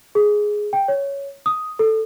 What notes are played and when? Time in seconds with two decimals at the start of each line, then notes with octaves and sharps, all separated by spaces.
0.15 G#4
0.73 G5
0.88 C#5
1.46 D#6
1.79 A4